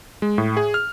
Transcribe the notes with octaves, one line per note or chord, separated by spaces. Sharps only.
G#3
A2
G#4
F6